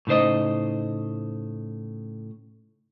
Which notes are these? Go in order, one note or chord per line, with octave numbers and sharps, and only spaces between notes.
A2 C#3 D#4 C5 D#5